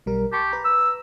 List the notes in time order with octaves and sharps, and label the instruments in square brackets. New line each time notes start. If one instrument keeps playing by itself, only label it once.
[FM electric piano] B1 G3 A#4
[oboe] G4 [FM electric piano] A5 C6 C#6
[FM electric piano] B4 A#5
[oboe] E6